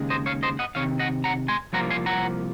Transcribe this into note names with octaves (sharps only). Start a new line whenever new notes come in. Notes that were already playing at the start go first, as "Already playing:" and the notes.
Already playing: D#2 C#3 G#3
C5 D#5
C#5 F5
C5 D#5
D#5 F#5
C3 D#3 C#5 F5
D#5 F#5
F#5 A#5
G#5 C6
C2 C3 F3 A#3 F4 F#5 A#5
F5 G#5
F#5 A#5